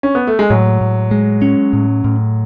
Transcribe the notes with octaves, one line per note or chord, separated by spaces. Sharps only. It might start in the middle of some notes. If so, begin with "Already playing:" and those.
C#4
B3
A3
G#3
A2 F#3
A2
G#3
C#4
A2
A2